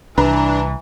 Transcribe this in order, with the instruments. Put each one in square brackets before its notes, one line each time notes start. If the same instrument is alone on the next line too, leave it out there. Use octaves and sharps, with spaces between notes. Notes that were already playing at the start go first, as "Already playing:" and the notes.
[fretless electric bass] C2 [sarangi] E3 [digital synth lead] D4 [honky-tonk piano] B4 A#5